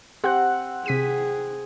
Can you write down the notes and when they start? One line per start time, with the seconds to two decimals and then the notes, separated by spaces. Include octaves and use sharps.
0.24 C4 G4 F#5 F#6
0.86 C3 G#4 B6 D#7